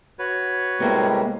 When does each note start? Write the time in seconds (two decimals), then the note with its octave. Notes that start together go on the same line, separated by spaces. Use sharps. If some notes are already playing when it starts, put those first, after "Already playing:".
0.19 F#4 B4 C#5
0.80 A2 C3 G3 G#3 A#3 B3